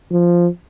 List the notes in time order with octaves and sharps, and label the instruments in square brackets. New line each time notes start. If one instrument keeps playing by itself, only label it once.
[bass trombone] F3